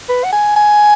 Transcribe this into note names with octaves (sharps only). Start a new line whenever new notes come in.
B4
F#5
G#5
G#5